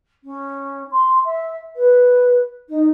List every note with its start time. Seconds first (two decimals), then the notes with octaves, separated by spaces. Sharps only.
0.24 C#4
0.91 C6
1.24 E5
1.76 B4
2.69 D#4